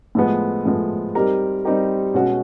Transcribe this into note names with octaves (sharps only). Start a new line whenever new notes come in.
A2 F3 G#3 B3
A2 F3 G#3 B3
G3 C4 D#4 G4 A#4
G3 C4 D#4 G4 A#4
B2 G#3 C#4 F#4